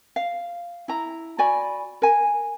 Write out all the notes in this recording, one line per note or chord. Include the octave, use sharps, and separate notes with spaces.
F5
E4 A#5
F#4 D5 G#5 B5
A#4 G#5